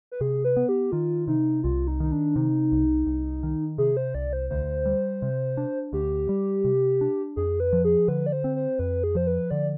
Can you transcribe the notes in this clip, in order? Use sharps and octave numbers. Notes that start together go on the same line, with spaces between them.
B4
C3 G#4
B4
B3
G4
D#3 F4
C3 D#4
C2 F4
D#4
D#3 D#4
D4
C3 D#4
C2
C2
D#3
C3 G#4
C5
C2 D5
C5
D2 C5
G3
C3
D4
D2 G4
G3
C3
D4
F2 G#4
B4
F3
G#4
D3 B4
D5
C5
C4
C5
F2 B4
G#4
F3 C5
B4
D3 D5